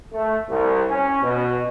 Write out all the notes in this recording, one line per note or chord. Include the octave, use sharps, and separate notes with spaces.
A3
C2
C#4
B2